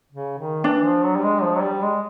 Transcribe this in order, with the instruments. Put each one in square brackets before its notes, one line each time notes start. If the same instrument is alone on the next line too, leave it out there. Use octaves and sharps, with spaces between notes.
[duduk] C#3
D#3
[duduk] E3 [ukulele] D4
[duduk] F3
F#3
G3
G#3
F3
F#3
G3
G#3